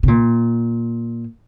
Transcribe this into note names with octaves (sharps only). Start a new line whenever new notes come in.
C3
A#2